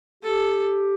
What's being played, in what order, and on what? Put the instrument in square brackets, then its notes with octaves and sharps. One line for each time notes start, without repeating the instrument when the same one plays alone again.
[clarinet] G4 [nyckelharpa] A4